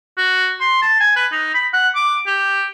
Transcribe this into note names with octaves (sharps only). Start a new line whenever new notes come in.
F#4
C6
A5
G#5
B4
D#4
B5
F#5
D6
G4